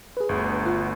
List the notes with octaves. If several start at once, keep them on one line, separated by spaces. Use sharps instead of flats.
G#4 B4
G1 D2
F4 F#5